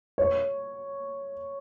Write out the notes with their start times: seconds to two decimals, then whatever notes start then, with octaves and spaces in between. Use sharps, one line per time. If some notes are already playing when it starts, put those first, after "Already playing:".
0.18 C#5